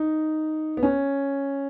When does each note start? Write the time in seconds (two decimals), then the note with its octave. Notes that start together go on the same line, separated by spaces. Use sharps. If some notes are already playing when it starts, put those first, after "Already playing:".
Already playing: D#4
0.77 B3
0.83 C#4